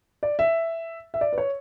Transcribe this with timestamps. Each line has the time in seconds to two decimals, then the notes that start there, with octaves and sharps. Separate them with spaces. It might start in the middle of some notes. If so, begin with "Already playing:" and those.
0.23 D5
0.39 E5
1.14 E5
1.21 D5
1.33 B4
1.38 C#5